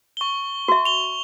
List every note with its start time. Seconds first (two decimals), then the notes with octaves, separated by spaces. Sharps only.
0.17 C#6 G7
0.68 F#4 E5
0.85 F7 G7